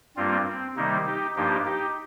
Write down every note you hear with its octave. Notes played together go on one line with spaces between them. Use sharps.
G2 G3 A#3 C4 F4
C4
C3 D#3 G3 A#3 D#4
D#4 G4
G2 F3 A#3 D#4 G4
D#4 G4